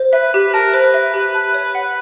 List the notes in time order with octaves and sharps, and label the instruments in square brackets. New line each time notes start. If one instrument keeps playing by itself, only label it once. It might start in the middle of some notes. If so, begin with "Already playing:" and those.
Already playing: [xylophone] C5
[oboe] B4 [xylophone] E5
[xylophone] G4 [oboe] B4
[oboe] A#4 [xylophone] A5
[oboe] B4 [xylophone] C5
[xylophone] E5
G4
A5
C#5
F#5